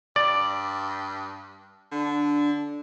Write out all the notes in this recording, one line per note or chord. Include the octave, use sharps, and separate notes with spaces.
G2 D5
D3 D4